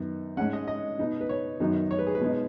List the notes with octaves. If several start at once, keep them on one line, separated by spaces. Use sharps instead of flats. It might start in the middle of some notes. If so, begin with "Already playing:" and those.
Already playing: F#2 D#3 B3 D#4
G#2 G#3 C#4 F#5
D#5
D#5
B2 B3 D#4
B4
C#5
F#2 D#3 F#3 B3 D#4
C#5
B4
G#4
B4
B2 G#3 D#4